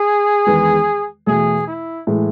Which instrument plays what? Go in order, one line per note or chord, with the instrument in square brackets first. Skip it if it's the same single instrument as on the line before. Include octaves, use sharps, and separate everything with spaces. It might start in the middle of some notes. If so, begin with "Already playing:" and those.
Already playing: [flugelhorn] G#4
[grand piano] E2 D#3 G#3 B3
[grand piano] E2 B2 A3 [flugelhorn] G#4
[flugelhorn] E4
[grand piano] A2 E3 G#3